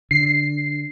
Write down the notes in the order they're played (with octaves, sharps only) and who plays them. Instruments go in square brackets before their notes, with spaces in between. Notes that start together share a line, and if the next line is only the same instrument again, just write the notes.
[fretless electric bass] D3 [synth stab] C7